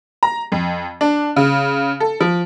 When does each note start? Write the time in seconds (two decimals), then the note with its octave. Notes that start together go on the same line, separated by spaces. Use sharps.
0.23 A#5
0.52 F2
1.01 D4
1.36 C#3
2.00 A4
2.20 F3